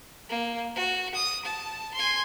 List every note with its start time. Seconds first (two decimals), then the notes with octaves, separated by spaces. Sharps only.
0.29 A#3
0.76 F#4
1.14 D#6
1.45 A5
1.94 G#5 C6